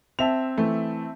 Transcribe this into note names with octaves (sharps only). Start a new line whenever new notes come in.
C4 E5 A5 F7
E3 A3